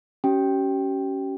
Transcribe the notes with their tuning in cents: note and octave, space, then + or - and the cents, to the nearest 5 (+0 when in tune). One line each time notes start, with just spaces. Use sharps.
C#4 +0 G4 -40 G5 +0